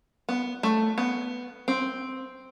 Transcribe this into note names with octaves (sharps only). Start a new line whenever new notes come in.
B3
A3
B3
C4